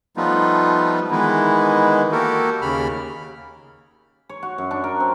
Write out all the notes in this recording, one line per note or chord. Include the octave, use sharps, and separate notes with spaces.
F3 G3 A3 B3 D#4 F4
D#3 E3 G#3 B3 D#4 E4
A#3 F#4 G4 A4 A#4
D#2 C#3 B5 F6
C#5
F#4
F#2
D4
A#4
C4